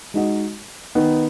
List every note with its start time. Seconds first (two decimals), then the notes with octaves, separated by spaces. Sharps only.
0.14 G#3 D#4 F#4 D#5
0.95 D#3 B3 D#4